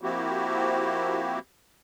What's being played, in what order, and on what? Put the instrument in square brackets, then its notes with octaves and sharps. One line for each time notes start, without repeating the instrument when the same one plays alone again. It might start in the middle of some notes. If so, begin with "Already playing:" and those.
[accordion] F3 A#3 C4 E4 F#4 G4